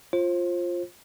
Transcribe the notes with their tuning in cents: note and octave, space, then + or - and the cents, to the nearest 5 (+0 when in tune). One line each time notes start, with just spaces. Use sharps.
F4 +0 C5 +30